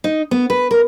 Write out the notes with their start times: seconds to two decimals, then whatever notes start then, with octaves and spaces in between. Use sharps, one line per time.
0.04 D#4
0.31 B3
0.50 B4
0.71 A#4